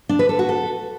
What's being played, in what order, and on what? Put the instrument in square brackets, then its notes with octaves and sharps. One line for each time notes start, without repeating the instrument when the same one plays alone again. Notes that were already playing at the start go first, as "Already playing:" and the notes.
[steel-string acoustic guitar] D4
B4
A4
F#4
A4